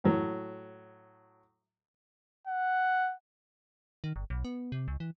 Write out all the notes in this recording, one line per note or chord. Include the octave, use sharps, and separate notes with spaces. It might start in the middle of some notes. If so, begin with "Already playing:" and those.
A2 F#3
F#5
D#3
G1
B1
B3
C3
C#2
E3